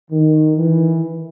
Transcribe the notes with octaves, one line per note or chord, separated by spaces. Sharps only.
D#3
E3